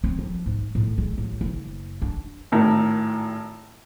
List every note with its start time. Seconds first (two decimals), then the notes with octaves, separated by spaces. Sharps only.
0.04 C4
0.19 F3
0.46 G#2
0.75 A2
0.98 G#3
1.18 A1
1.41 F#1
2.02 D4
2.52 G#1 A2 A#4